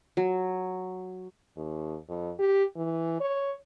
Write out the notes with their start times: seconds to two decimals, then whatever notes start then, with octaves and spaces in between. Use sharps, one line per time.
0.17 F#3
1.56 D#2
2.08 F2
2.39 G4
2.76 E3
3.21 C#5